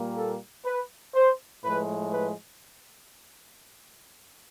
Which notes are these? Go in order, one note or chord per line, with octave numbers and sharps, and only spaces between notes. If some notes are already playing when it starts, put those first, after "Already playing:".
Already playing: A#2 G3 A#3
A4
B4
C5
A2 F3 G#3 B4
B4